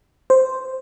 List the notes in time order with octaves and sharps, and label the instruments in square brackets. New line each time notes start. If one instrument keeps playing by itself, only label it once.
[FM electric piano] C5